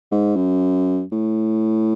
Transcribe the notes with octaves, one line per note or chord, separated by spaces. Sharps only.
G#2
F#2
A2